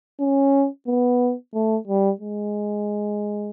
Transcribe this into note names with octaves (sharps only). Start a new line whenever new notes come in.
C#4
B3
A3
G3
G#3